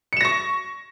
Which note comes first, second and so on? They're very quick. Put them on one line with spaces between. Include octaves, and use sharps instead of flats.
C#7 E7 A#6 C#6